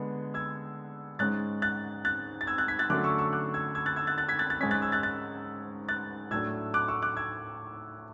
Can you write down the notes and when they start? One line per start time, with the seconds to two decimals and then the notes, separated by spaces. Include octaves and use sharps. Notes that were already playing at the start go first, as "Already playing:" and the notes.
Already playing: D3 G#3 B3
0.34 E6 G#6
1.19 G#2 G#3 C#4 F#6 A6
1.62 F#6 A6
2.05 F#6 A6
2.41 A6
2.47 E6 G#6
2.58 F#6 A6
2.68 G#6 B6
2.79 F#6 A6
2.90 D3 F#3 A3 C#4 D6 F#6
3.04 C#6 E6
3.18 C#6 E6
3.33 D6 F#6
3.54 E6 G#6
3.75 E6 G#6
3.86 F#6 A6
3.96 E6 G#6
4.07 F#6 A6
4.18 F#6 A6
4.28 G#6 B6
4.39 F#6 A6
4.50 F#6 A6
4.60 G#2 G#3 C#4 G#6 B6
4.71 F#6 A6
4.82 E6 G#6
4.92 F#6 A6
5.03 F#6 A6
5.89 F#6 A6
6.31 A2 F#3 A3 D4 E6 G#6
6.74 D6 F#6
6.88 C#6 E6
7.02 D6 F#6
7.17 E6 G#6